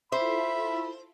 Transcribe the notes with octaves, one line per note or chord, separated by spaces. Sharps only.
E4 F4 A4 C5 E5 B5